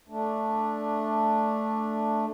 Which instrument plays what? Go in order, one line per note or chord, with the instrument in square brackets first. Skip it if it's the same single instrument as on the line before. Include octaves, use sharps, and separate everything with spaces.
[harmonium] A3 D4